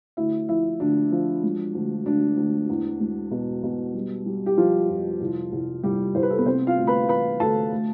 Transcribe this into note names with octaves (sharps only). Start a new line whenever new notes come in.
D2 E4
F3 E4
D2 D4
F3
E1
D2
D2 D4
D2
E2
E1
B2
B2
G3
G3
G4
F3 G3 F4
F2
C2
C2
C2 G3 G4
C2 C5
B4
A4
B3 B4
C3 C4 C5
F4 F5
D2
B4 B5
E3 B4 B5
D2 A4 A5
A3